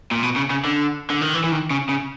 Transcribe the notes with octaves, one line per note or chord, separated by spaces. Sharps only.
A#2
B2
C#3
C#3
D3
D3
D#3
E3
E3
D#3
C#3
C#3